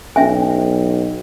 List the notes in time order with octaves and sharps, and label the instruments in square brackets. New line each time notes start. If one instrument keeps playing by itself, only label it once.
[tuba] B1 [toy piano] C#4 E5 G#5